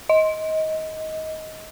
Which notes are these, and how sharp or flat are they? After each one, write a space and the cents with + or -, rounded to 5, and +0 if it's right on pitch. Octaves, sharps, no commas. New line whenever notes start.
D#5 +20